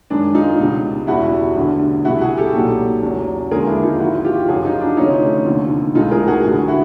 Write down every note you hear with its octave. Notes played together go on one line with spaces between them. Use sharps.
F#2 D#3 G#3 D4
D#4 F4
C#2 B2 G3
E1 E2 B2 G3 E4 F#4
A1 G2 D3
C2 B2 G3 E4 F#4
F#4 G#4
G4 A4
B1 A#2 F#3
E2 C#3 F#3
D#2 D3 F3 G#3 G#4 A#4
D4 E4
D#4 F4
G#1 G#2 F3 E4 F#4
F4 G4
F#2 C#3 F3 F#4 G#4
D#4 F4
D4
D2 C3 F3 A3 C#4 D#4
F1 D#2 D3 F3
B1 A2 E3 G#3 D#4 F4
G#4 A#4
F#4 G#4
A1 G2 D3
E4 F#4